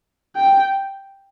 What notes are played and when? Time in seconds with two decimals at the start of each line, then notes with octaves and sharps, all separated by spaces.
0.37 G5